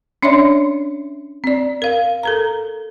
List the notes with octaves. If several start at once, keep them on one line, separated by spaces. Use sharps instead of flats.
C#4 D4 C#5 D5 E5 C6
C4 D5
A#4 F5
A4 A#4 A#5